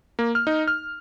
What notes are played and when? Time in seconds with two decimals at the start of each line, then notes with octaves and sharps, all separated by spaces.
0.19 A#3
0.35 F6
0.47 D#4
0.68 F6